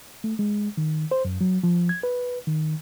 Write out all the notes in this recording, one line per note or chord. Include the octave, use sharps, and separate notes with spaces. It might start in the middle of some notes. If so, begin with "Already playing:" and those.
A3
G#3
D#3
C5
F#2
F#3
F3
G#6
B4
D#3